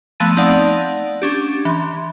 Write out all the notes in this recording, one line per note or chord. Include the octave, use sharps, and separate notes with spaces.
F3 A3 B3 A5 A6 D#7
A3 C4 D#4 D5 F5 F#5
C#4 D4 G4
E3 C6